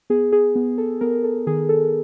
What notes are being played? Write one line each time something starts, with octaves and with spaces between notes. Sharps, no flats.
B3 G#4
G#4
B3
A4
B3 A#4
A4
D#3 G#4
A4